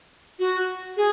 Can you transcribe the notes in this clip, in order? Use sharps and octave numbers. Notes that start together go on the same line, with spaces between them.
F#4
G#4